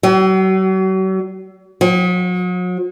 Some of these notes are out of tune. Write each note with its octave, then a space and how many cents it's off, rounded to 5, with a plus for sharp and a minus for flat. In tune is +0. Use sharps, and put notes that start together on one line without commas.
F#3 +40
F#3 -40